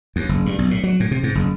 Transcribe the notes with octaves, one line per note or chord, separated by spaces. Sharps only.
D#2
F#1
G2
B1
A2
F#3
A2
C3
G#2
F#1